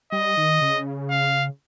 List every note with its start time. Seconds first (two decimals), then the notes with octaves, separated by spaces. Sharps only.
0.12 G3 D#5
0.37 D#3
0.61 C#3
1.10 F5